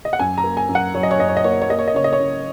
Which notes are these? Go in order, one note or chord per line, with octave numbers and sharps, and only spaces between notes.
D#5
F#5
F#2 G#5
A#5
A#3
G#5
F#2
F#5
F#3 C#5
D#5
C#5
F#2 D#5
C#5
D#5
A#3 C#5
D#5
C#5
A#3 D#5
C#5
D#5
C#3 C#5
D#5
C#5
C#3